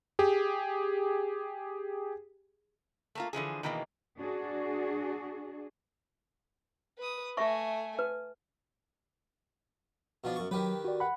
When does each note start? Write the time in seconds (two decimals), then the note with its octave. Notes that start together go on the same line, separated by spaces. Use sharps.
0.19 G4 G#4
3.15 A3 A#3 F4
3.33 D3 E3 F3 G#4
3.63 B2 D#3 E3 G#3 A#3
4.19 D4 F#4 G#4
6.98 B4 D#6
7.37 A3 E5 G#5 C#6
7.99 B4
10.24 B2 F3 D4
10.36 F#2 C#6
10.51 D#3 F#3 G4 B4
10.85 F#4 D5
11.00 F#5 B5